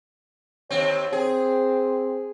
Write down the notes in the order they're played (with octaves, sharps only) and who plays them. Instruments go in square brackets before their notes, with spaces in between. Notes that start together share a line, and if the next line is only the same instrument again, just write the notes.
[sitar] D#2 C4 [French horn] C#5
[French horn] C4 [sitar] G#4